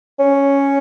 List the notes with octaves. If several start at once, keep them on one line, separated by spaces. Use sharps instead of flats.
C#4